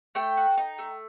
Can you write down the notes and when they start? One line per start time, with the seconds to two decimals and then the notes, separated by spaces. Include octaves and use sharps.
0.15 A3 G5
0.37 F#4
0.58 D#4
0.78 A3